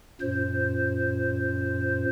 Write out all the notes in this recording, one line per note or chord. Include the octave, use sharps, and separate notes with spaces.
F#2 A#2 C5